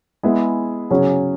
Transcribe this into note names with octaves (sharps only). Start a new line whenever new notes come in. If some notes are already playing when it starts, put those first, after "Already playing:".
G#3 B3 E4 G#4
C#3 F#3 C#4 G#4